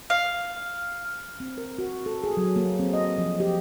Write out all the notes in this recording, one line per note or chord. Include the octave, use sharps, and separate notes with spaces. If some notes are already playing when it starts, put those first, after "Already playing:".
F5
C4
A#4
F#4
A4
G#4
F#3
A#3
C4
D#5
F3
G4